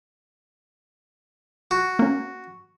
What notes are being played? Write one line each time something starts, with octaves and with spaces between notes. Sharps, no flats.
F#4
A#3 C#4